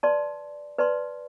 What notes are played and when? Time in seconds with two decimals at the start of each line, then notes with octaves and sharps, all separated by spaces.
0.03 B4 D5 A5 C6
0.78 B4 D5 A5 C6